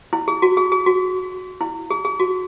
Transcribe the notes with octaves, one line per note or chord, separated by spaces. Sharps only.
E4
G#4
F#4
G#4
G#4
F#4
E4
G#4
G#4
F#4